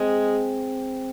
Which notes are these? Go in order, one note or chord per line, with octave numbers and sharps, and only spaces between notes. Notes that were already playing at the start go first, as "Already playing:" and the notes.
Already playing: G#3 C4